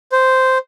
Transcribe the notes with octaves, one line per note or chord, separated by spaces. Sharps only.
C5